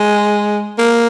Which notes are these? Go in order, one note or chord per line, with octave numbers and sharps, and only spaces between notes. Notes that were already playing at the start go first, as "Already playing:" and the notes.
Already playing: G#3
A#3